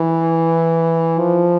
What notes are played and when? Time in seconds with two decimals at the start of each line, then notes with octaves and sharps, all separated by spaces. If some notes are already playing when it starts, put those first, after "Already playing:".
Already playing: E3
1.18 F3